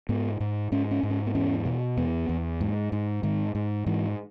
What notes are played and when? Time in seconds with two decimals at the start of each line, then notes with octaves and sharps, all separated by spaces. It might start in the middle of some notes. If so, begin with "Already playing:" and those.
0.09 G#2 B3
0.40 G#2
0.72 G#2 C#4
0.91 C#4
1.03 G#2
1.10 C#4
1.27 B3
1.35 E2 C#4
1.66 B2
1.97 E2 B3
2.29 E2
2.61 G#2
2.92 G#2
3.23 G#2 D#3
3.55 G#2
3.86 G#2 E3